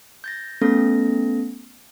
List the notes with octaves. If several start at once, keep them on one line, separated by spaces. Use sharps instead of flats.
G6 A6 A#6
A3 B3 C#4 A4 A#6